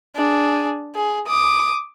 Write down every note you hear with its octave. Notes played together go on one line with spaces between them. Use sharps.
D4 G#4
G#4
D6 D#6